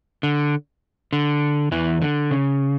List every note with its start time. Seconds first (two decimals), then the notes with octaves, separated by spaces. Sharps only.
0.23 D3
1.13 D3
1.72 E2 E3
2.02 D3
2.31 C#3